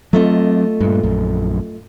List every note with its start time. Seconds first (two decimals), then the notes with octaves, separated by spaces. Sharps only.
0.13 F#3 A3 C4 F4 D#5
0.81 G2 A#2
1.03 A#1 F#2